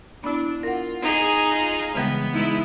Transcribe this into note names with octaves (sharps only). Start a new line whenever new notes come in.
B3 D4 E4
F4 A#4 F#5
D#4 G#4
F4 G#5
C#3 E3 G3 G#3 B3
G#3 D#4 E4